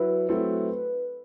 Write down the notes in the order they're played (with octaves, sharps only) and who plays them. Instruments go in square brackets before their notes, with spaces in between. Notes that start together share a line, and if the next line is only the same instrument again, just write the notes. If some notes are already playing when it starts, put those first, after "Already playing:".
Already playing: [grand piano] F#3 E4 [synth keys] B4
[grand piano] F#3 A3 C4 E4